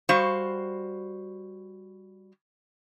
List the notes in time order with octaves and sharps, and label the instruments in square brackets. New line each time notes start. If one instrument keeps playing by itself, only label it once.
[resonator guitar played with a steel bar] G3 F#4 C5 F5